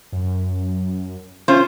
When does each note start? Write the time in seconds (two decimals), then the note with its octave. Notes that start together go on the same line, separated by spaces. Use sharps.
0.12 F#2
1.48 C#4 F4 C5